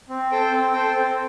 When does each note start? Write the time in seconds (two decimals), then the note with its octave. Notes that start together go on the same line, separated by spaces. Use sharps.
0.09 C4
0.31 A4 C5 G5
0.52 C4
0.73 A4 C5 G5
0.94 C4